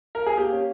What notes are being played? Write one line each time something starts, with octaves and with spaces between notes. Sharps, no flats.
A#4
G#4
A#3 G4
C#4